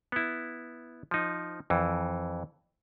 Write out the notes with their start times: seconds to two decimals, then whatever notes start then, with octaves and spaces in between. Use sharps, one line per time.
0.12 B3 E4
1.11 F3 D#4
1.70 F2 E3